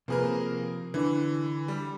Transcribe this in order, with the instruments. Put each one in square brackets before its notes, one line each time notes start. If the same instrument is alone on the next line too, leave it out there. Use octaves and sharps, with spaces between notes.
[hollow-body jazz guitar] C3 F3 B4 [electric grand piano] A#3 G#4 A#4
[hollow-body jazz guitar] D3 D4 [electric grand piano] E3
[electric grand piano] G3